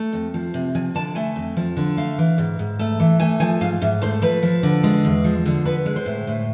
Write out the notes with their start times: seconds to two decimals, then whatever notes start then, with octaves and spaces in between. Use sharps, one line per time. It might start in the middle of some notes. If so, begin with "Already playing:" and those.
Already playing: A3
0.13 F2
0.34 F3
0.54 C3
0.75 F3 G#5
0.95 D3 A5
1.15 A3 G#5
1.36 F2
1.57 F3
1.77 D3
1.97 A3 F5
2.18 E3
2.38 G#2
2.59 G#2
2.79 A3
3.00 E3
3.20 A3 G#5
3.40 F3 G#5
3.61 G#2 F5
3.82 G#2 E5
4.01 A3 C5
4.22 F3 B4
4.43 F3
4.63 D3
4.83 G#3
5.05 E2
5.24 F3
5.46 D3
5.65 B3 B4
5.86 G#3
5.96 C5
6.06 A2
6.27 A2